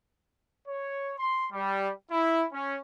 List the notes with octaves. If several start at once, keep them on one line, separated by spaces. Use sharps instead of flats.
C#5
C6
G3
E4
C#4